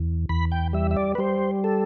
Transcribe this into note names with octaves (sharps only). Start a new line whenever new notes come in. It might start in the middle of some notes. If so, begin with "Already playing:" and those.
Already playing: E2
E2 B5
G5
G3 E5
E5
D5
B4
G3 C5
A4